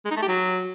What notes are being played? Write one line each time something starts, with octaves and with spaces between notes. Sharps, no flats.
G#3
D#4
A3
G4
F#3